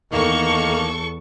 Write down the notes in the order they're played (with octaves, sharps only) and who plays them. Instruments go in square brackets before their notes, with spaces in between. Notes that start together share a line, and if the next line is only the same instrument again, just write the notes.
[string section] E2 A4 C#6 [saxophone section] D#3 A#3